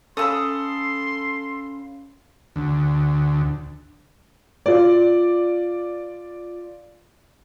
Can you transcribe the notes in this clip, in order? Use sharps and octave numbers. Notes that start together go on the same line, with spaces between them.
C#4 A4 F5 B5 C6 D#6 E6
D2
F4 D5